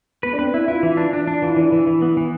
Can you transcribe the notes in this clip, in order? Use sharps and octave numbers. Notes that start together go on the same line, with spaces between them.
B3 B4
D4
C4 B4
D4 E4
E4 F4
E3
D4
D4
D4
E3 F4
E4
E3 D4
E4
E3
E3
B3
E3